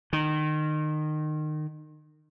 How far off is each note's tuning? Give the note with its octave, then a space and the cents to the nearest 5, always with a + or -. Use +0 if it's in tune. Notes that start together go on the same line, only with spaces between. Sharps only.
D#3 -25